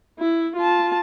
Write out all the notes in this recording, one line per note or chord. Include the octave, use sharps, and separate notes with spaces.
E4
F4 A5